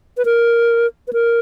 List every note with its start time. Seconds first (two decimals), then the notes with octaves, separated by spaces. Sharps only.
0.18 B4
0.25 A#4
1.08 B4
1.13 A#4